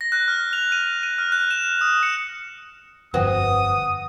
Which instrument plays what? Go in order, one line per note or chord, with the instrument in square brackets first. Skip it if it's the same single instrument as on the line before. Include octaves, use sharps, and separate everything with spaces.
[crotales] A#6
F#6
F6
F7
D#7
D#7
F6
F#6
E7
D#6
C#7
[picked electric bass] G1 F2 [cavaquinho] F#4 [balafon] B4 C5 G5 [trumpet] D#6